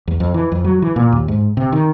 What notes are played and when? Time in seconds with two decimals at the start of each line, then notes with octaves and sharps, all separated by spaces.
0.08 E2
0.20 F2
0.34 E3
0.52 F2
0.64 F#3
0.82 E3
0.96 A#2
1.12 D#2
1.28 G#2
1.57 C3
1.72 D#3